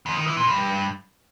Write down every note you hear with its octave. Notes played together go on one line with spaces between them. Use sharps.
F2
D#3
E3
A#2
G2